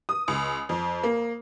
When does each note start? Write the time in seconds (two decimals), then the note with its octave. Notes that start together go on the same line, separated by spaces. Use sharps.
0.09 D#6
0.28 C#2
0.69 F2
1.03 A#3